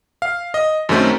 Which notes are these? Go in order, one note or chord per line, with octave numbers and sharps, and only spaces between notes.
F5
D#5
F#2 D#3 F#3 A3 C4 C#4